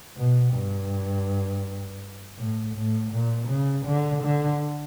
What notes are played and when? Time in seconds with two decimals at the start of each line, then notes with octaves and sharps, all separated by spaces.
0.17 B2
0.54 G2
2.39 A2
2.76 A2
3.12 A#2
3.49 C#3
3.86 D3
4.23 D3